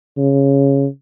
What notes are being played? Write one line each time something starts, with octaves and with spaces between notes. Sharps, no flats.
C#3